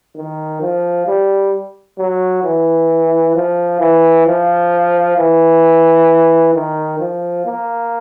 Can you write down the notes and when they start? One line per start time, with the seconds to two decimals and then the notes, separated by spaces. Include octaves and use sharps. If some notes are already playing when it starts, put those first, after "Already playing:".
0.16 D#3
0.61 F3
1.07 G3
1.98 F#3
2.43 E3
3.35 F3
3.80 E3
4.26 F3
5.17 E3
6.54 D#3
6.99 F3
7.46 A#3